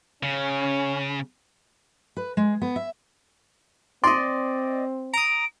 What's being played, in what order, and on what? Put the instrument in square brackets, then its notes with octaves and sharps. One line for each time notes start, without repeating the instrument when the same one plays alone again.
[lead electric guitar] C#3 [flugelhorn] C#4
[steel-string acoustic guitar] B4
G#3
B3
E5
[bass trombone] C4 [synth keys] D5 D#5 [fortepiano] C6
[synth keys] A#5 D#6 [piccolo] D7